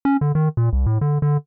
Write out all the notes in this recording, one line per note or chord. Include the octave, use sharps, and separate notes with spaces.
C#4
D3
D#3
A#2
C2
A2
D3
D3